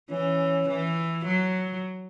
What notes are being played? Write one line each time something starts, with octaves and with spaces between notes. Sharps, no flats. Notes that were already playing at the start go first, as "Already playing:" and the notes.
E3 C#4
E3
F#3